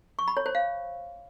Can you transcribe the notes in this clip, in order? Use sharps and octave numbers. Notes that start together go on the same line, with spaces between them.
C#6
B5
C#5
C5
F5